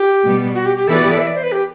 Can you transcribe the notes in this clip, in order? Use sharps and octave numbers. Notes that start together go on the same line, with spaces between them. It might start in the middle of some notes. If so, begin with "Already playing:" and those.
Already playing: G4
B2 G3 B3
F#4
G4
G4
E3 B3 E4 A4 B4 D5
F#4
G4
A4
E5
D5
C5
B4
G4